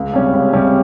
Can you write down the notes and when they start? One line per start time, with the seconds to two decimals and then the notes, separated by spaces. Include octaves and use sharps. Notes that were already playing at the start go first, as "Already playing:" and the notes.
Already playing: C#2
0.13 C3 G3 C#4
0.34 C#2
0.53 C3 G3 C#4